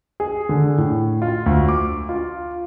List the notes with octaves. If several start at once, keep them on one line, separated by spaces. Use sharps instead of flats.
G#4
D3
A2
F4
D2
D6
F4